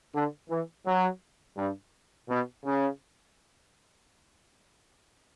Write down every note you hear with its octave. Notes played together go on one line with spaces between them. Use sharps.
D3
E3
F#3
G2
B2
C#3